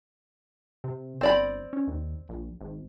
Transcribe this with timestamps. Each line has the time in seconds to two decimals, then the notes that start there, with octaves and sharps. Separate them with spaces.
0.84 C3
1.21 G1 C4 D5 B5
1.73 C#4
1.87 D#2
2.29 A#1
2.61 G#1